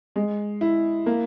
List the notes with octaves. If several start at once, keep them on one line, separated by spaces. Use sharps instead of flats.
G#3
E4
A#3